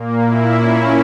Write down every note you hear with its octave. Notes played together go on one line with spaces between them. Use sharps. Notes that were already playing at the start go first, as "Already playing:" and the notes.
Already playing: A#2 A#3
E4
C#4